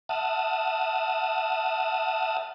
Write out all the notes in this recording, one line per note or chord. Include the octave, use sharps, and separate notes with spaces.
E5 F#5 A5 D#6 F6